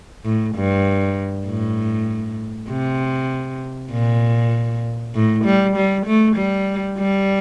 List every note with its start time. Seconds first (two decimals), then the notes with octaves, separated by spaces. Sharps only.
0.24 A2
0.55 G2
1.47 A2
2.69 C3
3.91 A#2
5.15 A2
5.44 G3
5.76 G3
6.06 A3
6.36 G3
6.98 G3